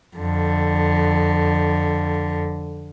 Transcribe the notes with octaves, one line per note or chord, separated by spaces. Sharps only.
F2 D3